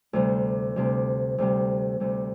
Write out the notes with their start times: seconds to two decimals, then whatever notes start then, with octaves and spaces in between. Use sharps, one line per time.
0.13 D2 C3 G3
0.76 D2 C3 G3
1.38 D2 C3 G3
2.00 D2 C3 G3